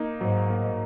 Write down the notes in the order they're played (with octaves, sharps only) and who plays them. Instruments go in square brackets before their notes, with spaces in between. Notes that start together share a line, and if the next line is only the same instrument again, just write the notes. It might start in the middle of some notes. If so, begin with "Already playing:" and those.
Already playing: [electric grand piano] A#3 D#4
[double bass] G#2 [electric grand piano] F#3
[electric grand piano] A#3